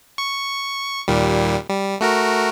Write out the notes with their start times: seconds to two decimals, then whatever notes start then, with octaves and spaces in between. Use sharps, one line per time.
0.18 C#6
1.08 D#2 A#2 G3
1.69 G3
2.01 A3 F#4 A#4